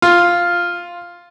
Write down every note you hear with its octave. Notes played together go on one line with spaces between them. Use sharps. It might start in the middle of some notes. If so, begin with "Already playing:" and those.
F4